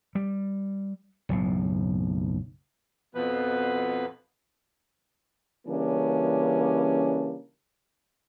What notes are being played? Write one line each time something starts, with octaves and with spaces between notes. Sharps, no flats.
G3
F#1 B1 A2
F2 B2 F3 B3 B4
C#3 E3 G3 A#3 C#4 D4